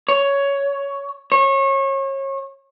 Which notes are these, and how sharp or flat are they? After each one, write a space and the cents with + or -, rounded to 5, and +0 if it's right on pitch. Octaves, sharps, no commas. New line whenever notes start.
C#5 +10
C#5 -30